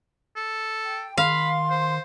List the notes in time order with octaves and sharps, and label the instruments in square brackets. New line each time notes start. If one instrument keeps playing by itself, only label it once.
[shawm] A4
[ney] G5
[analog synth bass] D#3 [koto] F5 [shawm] B5 [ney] C6
[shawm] C5